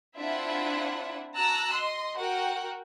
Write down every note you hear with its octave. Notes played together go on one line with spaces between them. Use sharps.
C4 D4 E4 F4 E5 F#5
F#4 A5 A#5 E6 F#6
D#5 C6
F#4 A#4 F#5 G5